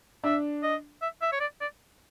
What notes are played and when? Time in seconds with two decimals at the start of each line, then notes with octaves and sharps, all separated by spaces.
0.24 D4 E5
0.63 D#5
1.02 E5
1.22 E5
1.33 C#5
1.40 D5
1.61 D5